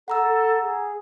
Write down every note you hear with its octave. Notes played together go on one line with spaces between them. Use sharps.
A4 F#5 A#5 E6
A4
G#4